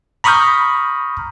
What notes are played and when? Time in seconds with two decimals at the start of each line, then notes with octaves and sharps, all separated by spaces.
0.24 A#5 B5 C#6 D#6 F6 G6